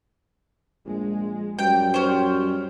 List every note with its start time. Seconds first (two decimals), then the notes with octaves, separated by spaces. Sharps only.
0.86 A#1 G#3
1.59 F#2 G3 G5
1.94 C#4 C5